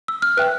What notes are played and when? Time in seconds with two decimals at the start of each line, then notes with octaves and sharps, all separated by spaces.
0.08 E6
0.22 F6
0.37 B4 E5 G5 F#6